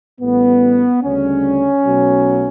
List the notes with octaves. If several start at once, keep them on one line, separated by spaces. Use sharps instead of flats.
A1 A2 G3 B3
D2 C#3 G3 C#4
B1 B2 F#3 A3